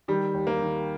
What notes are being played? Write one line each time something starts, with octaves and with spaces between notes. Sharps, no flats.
D#3 G3
D#2
A#3
D#3